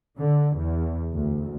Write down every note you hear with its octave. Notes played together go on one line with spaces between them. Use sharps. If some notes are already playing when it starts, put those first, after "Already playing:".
D3
E2
D2